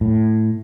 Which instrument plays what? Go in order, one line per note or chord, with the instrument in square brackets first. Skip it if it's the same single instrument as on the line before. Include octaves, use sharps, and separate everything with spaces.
[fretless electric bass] A2